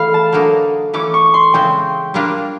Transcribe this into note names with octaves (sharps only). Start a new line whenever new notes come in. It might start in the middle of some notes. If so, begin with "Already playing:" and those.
Already playing: E3 A3 G#4 F5 B5
A5
D3 F#3 A#3 D#4
E3 A3 C#4 D6
C#6
C6
C#3 E3 G#3 C4 G5
G3 A#3 D4 F4